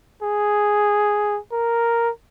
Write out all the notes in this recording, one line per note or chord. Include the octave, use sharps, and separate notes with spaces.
G#4
A#4